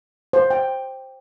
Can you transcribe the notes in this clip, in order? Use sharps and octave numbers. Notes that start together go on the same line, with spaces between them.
C5
G5